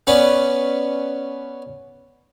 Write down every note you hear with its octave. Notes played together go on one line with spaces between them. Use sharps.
B3 C#4 B4 D5